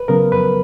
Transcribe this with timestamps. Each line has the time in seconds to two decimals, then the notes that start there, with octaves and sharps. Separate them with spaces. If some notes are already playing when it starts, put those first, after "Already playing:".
Already playing: B4
0.08 C#3 F#3 B3 A#4
0.32 F2 B4